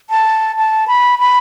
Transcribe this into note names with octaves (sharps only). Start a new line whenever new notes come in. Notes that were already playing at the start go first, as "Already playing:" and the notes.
A5
A5
B5
B5